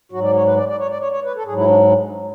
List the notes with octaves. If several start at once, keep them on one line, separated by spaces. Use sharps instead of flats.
G#2 F#3 F#4
D5
C#5
B4
D5
D5
C#5
D5
C#5
C#5
B4
A4
G#2 F#3 G#4
E4
D4